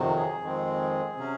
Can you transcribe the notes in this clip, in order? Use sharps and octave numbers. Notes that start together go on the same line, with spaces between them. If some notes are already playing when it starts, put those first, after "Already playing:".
Already playing: F2 C3 D#3 F#3
G#4
F2 D#3 G#3 C4
C3 F#3 C#4